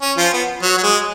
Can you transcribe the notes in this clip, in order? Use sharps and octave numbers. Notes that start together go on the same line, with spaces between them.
C#4
F3 F4
B3
F#3
F#3
G#3